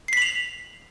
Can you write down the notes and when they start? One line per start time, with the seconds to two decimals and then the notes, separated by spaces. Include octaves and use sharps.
0.08 C7
0.13 B6
0.17 F#7
0.22 F7